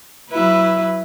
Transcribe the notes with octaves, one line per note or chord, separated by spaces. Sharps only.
F#3 E4 B4